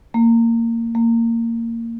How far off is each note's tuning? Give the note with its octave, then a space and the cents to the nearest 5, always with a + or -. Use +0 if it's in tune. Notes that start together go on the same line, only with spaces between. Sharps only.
A#3 -20
A#3 -20